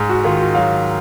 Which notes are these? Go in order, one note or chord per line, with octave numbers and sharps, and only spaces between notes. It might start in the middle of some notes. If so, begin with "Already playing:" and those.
Already playing: G#2
F#4
D#3 F4
F#4
F#3 F5